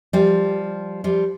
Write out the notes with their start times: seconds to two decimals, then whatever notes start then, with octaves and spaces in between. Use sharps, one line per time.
0.13 F3 G3
1.04 F3 G3